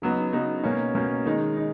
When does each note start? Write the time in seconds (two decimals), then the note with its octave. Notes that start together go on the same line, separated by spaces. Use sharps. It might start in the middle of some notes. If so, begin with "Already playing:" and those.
0.02 C#3 F#3 B3 D#4
0.33 C#3 F#3 B3 D#4
0.64 B2 A#3 C#4
0.95 B2 A#3 C#4
1.25 D#3 G#3 D#4
1.57 D#4